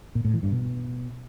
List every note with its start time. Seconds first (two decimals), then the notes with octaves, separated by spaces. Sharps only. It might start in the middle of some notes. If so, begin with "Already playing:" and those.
0.15 A#2
0.25 A2
0.34 E3
0.43 G2
0.52 B2